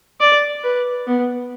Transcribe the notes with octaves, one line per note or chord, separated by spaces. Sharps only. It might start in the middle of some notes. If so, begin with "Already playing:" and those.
D5
B4
B3